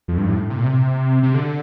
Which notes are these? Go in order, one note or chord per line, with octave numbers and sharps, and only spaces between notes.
F2
G2
A2
C3
A#2
C3
C3
D3